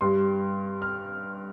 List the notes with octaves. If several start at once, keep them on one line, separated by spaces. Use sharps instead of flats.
G2 G3 C6
F6